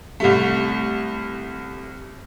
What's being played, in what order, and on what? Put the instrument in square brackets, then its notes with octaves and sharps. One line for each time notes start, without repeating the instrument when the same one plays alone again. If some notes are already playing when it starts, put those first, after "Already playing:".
[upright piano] C2 G3 A3